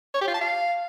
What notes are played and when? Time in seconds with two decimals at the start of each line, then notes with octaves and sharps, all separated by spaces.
0.14 C#5
0.21 G4
0.28 F4
0.34 A5
0.41 F5